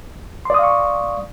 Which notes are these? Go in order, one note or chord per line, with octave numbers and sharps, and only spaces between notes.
D5 F5 C6 C#6 D#6